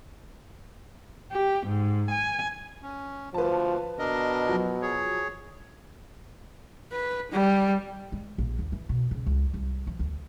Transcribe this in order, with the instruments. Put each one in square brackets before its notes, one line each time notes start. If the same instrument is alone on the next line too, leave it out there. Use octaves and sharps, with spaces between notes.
[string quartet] G4
G#2
G#5
[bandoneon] C#4
[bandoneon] D2 [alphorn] F3 [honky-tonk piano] B4 A5
[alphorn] B2 [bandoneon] D4 A#4 D#5
[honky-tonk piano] F3 F#3
[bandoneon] G#4 C#5
[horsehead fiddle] B4
G3
[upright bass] G#3
A#1
D#2
E3
B2
C#3
C#2
C2
F3
D2